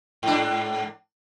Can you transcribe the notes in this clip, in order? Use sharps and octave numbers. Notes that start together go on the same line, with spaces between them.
G#2 D4